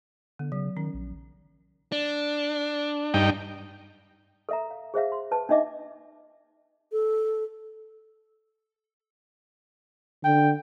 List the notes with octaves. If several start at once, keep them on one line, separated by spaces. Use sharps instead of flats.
D3 B3
C#3 F#3
D#3 C#4
A#1
D4
G2 D#4 G5
A4 E5 A#5
F5
G#4 C5 E5 F5
C6
B4 A5
D4 D#4 D#5 E5 D6
A4
D3 G5